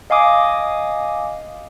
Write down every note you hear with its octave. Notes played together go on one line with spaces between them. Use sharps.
D#5 F5 G#5 D6 D#6